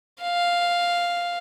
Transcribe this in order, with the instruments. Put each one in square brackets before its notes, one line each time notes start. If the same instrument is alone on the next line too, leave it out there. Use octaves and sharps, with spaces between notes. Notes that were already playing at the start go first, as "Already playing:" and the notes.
[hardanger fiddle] F5